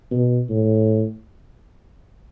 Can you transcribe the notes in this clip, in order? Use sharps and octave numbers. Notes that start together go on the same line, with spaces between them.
B2
A2